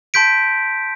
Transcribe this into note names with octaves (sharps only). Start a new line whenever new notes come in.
A5 C6 G6 B6 D7